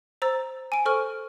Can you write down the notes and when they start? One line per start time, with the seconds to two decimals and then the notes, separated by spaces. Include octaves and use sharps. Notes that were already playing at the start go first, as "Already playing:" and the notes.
0.22 C5 A#5 E6 A6
0.72 G#5 D7
0.85 A4 C5 C#6 F6